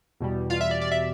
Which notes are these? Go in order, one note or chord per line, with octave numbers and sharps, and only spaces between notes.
E2 B2 G3
F4 F5
E5
D5
D5
E5